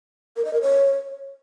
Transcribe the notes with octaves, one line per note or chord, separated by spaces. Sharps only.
A#4
D#5
A#4
C#5